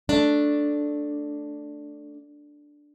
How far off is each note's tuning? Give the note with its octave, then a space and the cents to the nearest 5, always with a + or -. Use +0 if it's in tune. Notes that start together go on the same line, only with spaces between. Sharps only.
A3 +0 D4 +0